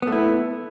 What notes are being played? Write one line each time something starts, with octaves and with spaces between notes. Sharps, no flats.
A3 B3 E4